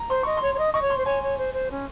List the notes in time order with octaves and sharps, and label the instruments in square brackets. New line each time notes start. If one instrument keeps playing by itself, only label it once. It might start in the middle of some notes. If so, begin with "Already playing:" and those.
Already playing: [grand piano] A#5
[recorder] C5 [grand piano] C6
[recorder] D#5 [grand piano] C#6
[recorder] C#5 [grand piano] C6
[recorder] C#5
D#5
[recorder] D#5 [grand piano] C#6
[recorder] C#5
[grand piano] C6
[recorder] C5
[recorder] C#5 [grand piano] G#5
[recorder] C#5
C5
C5
C#4